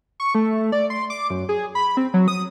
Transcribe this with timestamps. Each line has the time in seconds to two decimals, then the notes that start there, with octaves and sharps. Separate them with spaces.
0.20 C#6
0.35 A3
0.72 D5
0.90 C6
1.10 D6
1.30 F#2
1.49 G#4
1.75 B5
1.97 C4
2.14 F#3
2.28 D#6